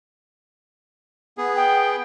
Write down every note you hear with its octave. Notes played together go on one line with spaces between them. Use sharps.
B3 G#4
G5